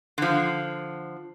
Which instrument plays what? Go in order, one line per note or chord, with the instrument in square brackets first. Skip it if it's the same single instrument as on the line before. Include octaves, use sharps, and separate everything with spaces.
[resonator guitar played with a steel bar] D3 F3